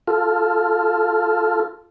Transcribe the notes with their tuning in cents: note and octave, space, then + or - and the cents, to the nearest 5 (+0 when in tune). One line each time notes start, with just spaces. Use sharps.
F4 +0 A4 +0